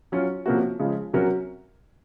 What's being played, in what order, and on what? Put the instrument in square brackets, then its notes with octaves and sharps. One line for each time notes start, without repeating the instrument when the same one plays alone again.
[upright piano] F#3 C#4 F4
C3 F3 A#3 C#4 F#4
C#3 F3 G#3
C3 F#3 C#4 F#4 A#4